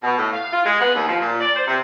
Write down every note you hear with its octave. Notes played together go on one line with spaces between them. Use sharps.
B2
A2
F5
F4
G#3
B3
D#2
F3
A#2
D5
C5
C3